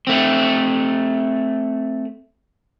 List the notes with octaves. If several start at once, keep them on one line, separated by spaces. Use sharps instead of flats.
A3 C4